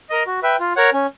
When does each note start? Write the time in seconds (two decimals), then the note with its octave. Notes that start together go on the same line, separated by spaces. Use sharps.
0.10 A#4 D#5
0.27 F#4
0.43 B4 E5 G5
0.60 F4
0.76 A#4 C#5 F#5
0.93 C#4